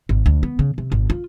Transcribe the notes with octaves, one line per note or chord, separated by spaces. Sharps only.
G#1
D2
B3
C#3
C3
G#1
F4